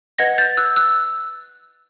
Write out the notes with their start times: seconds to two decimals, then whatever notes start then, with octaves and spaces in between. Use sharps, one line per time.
0.18 B4 D#5 F#5 G#6 A#6
0.38 G6 A6
0.57 E6 F#6
0.76 E6 F#6